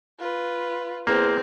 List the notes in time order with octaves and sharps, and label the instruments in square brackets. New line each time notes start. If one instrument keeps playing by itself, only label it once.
[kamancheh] F4 B4
[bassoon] E2 [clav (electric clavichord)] A#3 [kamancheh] C4 C5